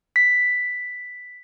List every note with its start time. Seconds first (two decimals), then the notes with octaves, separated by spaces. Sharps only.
0.16 B6